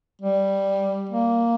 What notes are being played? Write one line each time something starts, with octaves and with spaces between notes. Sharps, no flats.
G3
A#3